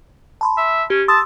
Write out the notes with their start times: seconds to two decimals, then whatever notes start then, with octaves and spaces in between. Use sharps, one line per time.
0.41 A5 B5 C6
0.57 E5
0.90 C#4 G4
1.08 A5 C6 D#6 E6